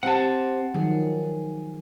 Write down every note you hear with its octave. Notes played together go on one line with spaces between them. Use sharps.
C4 G4 F#5 A5
D#3 F3 F#3 G#4